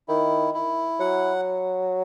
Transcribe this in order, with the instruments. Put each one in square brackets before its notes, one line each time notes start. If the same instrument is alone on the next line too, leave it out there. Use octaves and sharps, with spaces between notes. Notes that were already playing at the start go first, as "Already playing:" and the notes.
[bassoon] D#3 [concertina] E4
[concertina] E4
[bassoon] F#3 [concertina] F#5